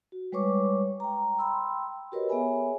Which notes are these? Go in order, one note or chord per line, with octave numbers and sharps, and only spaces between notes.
F#4
G3 G#3 B4 C#5 C#6 D6
G5 A#5
G5 B5 C6 E6
F#4 G4 A#4 B4 C#5 D#5
B3 G#4 C#5 E5 G#5 B5